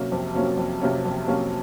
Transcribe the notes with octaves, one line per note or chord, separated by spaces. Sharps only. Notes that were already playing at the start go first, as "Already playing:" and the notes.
Already playing: C3 F#3 A#3 C#4
F2
C3 F#3 A#3 C#4
F2
C3 F#3 A#3 C#4
F2
C3 F#3 A#3 C#4